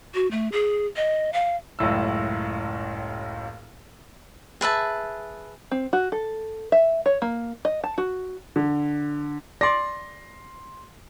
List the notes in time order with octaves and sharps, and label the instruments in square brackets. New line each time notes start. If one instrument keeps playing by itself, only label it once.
[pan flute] F#4
A3
G#4
D#5
F5
[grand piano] F#1 C#2 A2 E6
[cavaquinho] G#4 B4 E5 A5
[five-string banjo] C4
F#4
A4
E5
C#5
A#3
D#5
A5
F#4
[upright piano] D3
[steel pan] D5 [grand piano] C6 A#6